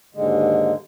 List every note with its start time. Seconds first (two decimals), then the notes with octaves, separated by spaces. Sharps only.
0.15 D#2 G#2 D3 G#3